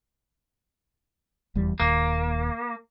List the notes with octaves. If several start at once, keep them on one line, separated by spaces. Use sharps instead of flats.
F1 E2 G3
D#1 D#2 A#3